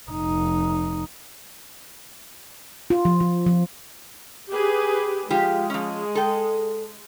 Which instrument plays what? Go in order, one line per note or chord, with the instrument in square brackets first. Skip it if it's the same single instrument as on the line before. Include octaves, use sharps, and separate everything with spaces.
[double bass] F1 D#4
[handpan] F4
F3
F3
F3
[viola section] G4 G#4 B4
[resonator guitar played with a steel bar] F3 F4 G4 [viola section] G#3
[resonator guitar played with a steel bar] F3 C#4
A4 G5